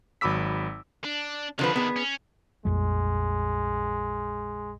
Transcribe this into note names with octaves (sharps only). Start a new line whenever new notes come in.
G#1 F#3 B5 D6 E6 B6
D4
D3 D#3 F3 D4 B4
B3 G#4
C#4
A#1 F2 G3 G#3